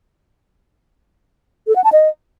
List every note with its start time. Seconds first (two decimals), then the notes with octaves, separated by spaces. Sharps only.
1.67 A4
1.76 F#5
1.84 A5
1.93 D#5